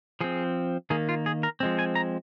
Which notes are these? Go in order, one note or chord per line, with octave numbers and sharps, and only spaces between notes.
F3 C4 G#4
D#3 A#3 G#4
F4
G#4
A#4
F3 G#3 C4
G#5
A#5